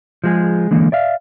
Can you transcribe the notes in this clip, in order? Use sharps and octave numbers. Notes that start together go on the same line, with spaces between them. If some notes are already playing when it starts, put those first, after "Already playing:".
F3 G#3 G#4
D3 E3 G#3 A#3
D5 E5 F5